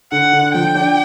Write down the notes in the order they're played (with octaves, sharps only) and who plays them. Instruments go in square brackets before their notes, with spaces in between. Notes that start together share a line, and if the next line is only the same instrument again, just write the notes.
[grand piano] D3 [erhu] F#5
[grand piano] D3
[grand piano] F3 [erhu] G5
[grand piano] D4